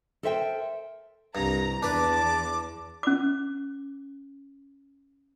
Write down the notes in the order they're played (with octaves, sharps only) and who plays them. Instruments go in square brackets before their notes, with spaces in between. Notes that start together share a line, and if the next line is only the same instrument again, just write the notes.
[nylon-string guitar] A4 A#4 C5 E5 F5 G5
[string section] C2 A#5 [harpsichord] G2
[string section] E2 [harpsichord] D4 B4 [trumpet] A5 [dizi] D6
[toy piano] C#4 D6